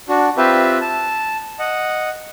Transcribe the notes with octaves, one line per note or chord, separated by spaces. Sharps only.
D4 F#4
C4 F4 G4 B4 E5
A5
D#5 F#5